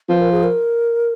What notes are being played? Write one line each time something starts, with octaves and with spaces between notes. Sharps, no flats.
F3 B4
A#4
G#4
A#4